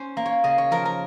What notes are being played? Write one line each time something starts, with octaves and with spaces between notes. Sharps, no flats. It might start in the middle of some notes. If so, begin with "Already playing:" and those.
Already playing: C#4 C5
A#3
C#5
C#3 D#5
C#5
F3 A#4
A#4